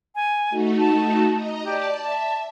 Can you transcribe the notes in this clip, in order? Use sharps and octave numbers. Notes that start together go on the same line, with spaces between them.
G#5
A3 D#4 F#4
A5
D#5 A#5
G4 D5 A5
E5 A5